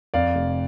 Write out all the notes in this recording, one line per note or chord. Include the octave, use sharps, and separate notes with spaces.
F2 D5 F5
F1